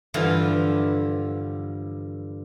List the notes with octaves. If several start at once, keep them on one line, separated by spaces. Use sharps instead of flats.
G2 D3 E3 F3 F4